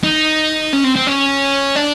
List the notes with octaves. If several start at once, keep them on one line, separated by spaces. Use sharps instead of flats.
D#4
C#4
C4
C4
C#4
D4